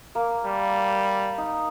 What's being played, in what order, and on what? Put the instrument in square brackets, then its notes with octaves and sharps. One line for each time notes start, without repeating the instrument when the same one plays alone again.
[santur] A#3
[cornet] G3
[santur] D#4